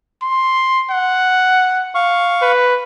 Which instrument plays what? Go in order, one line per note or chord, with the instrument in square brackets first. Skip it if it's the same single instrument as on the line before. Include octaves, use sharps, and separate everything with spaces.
[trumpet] C6
F#5
[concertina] F5 C#6
[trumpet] B4